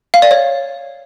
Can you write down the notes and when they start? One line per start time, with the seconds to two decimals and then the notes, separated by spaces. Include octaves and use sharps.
0.14 F5
0.22 D5
0.31 C#5